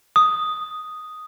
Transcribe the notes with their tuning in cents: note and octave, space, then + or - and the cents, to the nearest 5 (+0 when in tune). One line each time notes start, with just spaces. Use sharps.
D#6 +0